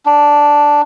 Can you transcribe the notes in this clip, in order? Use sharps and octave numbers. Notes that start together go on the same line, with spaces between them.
D4